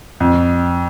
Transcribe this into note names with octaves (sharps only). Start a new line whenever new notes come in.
F2